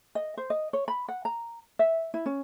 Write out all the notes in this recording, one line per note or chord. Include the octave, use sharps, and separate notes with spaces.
D#5
C5
D#5
C#5
B5
F#5
A#5
E5
E4
C#4